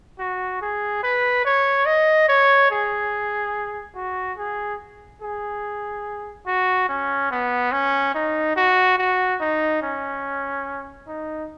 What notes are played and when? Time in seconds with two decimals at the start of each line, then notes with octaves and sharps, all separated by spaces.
0.19 F#4
0.61 G#4
1.03 B4
1.45 C#5
1.86 D#5
2.28 C#5
2.71 G#4
3.95 F#4
4.38 G#4
5.21 G#4
6.46 F#4
6.89 C#4
7.31 B3
7.72 C#4
8.14 D#4
8.56 F#4
8.98 F#4
9.40 D#4
9.82 C#4
11.07 D#4